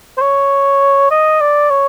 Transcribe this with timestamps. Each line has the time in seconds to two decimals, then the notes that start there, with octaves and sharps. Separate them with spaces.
0.17 C5
0.21 C#5
1.11 D#5
1.41 D5
1.70 C#5